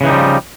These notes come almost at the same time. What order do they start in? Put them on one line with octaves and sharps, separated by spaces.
C#3 E3 D#4 G3 F3